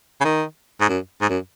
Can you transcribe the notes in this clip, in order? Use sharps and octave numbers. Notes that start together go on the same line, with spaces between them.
C#3
D#3
G#2
F#2
G#2
F#2